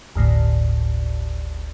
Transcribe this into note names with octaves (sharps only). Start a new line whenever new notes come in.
G1 D2 A2